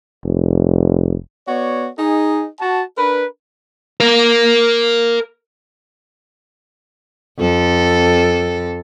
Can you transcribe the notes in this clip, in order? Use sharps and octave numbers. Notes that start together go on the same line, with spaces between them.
F1
B3 F#4 C#5 D5
D#4 G#4
F#4 A5
D4 A#4 B4
A#4 F5
F2 A4